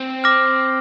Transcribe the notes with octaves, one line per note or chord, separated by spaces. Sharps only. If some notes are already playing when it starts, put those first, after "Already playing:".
Already playing: C4
D6 F6 A#6